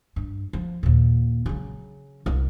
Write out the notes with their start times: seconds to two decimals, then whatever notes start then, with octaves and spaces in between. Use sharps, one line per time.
0.16 G2
0.53 F3
0.83 D#2 A#2
1.46 C#3 F#3
2.26 C2